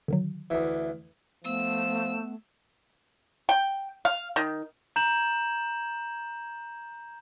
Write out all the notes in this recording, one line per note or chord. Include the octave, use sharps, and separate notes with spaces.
D3 D#3 F#3
D2 E3
F3 A3 B3 E6
G5
F5
D#3
A#5 G6 E7 F#7